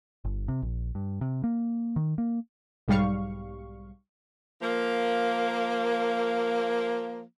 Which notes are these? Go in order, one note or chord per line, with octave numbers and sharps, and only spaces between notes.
G1
C3
A#1
G2
C3
A#3
D#3
A#3
B1 G#2 G3 F5 C#6
F3 A#3